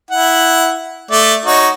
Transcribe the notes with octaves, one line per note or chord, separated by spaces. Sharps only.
E4 F#5
A3 D5
D#4 F#4 C#5